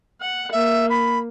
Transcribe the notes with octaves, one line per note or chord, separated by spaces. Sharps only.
F#5
A#3 E5
B5